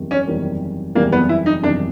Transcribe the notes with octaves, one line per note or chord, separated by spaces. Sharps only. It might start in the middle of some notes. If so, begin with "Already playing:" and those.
Already playing: F#1 E2 C3 D#3 G3
C#4
F#1 E2 C3 D#3 G3
F#1 E2 C3 D#3 G3 A#3
B3
E4
D#4
F#1 E2 C3 D#3 G3 D4